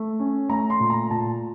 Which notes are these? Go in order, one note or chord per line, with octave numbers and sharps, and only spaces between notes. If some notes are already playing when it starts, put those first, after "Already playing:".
Already playing: A3
C#4
A3 A#5
C6
A#2
A#5
A#2 A5